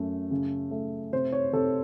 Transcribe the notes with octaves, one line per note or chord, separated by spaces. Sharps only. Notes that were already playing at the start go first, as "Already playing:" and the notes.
Already playing: F#2 A3
C#3
A3
C3 C5
C#5
C3 A4